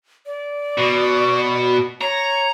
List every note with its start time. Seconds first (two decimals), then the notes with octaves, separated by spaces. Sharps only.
0.26 D5
0.78 B2
2.01 C#5 A#5